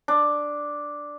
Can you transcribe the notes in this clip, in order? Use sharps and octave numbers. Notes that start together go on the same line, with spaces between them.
D4